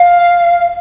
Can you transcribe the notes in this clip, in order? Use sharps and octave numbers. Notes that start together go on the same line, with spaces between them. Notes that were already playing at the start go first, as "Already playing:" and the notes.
Already playing: F5